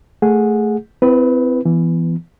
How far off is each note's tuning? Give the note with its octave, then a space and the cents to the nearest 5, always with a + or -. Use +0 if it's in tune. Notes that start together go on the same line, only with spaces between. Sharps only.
A3 +0 G#4 +0 F#5 -20
C4 -30 E4 +10 B4 +0
E3 +20 B3 +0